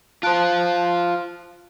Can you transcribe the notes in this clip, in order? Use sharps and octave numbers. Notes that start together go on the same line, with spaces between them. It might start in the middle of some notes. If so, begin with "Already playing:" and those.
F4 C5 A5 F#6 D7